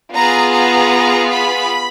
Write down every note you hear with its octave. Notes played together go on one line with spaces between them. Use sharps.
B3 F4 G#4 A#5
A#5
B5